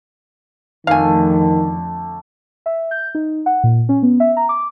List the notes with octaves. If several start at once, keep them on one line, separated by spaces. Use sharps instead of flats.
F2 D3 D#3 A3 F5 G#5
E5
G6
D#4
F#5
A#2
C#4
B3
E5
A#5
D6